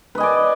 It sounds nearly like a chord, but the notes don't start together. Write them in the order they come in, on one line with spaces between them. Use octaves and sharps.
B4 D#5 G#5 D5